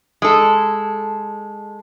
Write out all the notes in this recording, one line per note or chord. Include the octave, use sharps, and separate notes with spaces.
G#3 A4